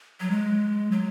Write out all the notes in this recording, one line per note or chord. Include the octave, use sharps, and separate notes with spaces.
F#3
G#3
F#3